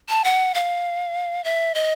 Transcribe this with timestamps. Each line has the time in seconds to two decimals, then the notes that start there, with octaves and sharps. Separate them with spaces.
0.09 A5
0.24 F#5
0.54 F5
1.44 E5
1.75 D#5